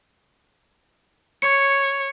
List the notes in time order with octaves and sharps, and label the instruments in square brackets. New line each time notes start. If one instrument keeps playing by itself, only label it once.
[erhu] C#5 [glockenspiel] C#7